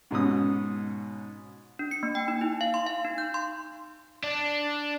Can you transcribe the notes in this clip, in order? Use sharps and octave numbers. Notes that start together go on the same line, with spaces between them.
G#2 B2 C#4 D#6
D4
C#7
A#3
G5
D#4
E4
F5
C6
F5
D#4
G6
C6
D4